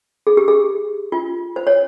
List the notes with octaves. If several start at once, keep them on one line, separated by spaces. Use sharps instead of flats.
G#4
G4
G#4
F4
C5
C#5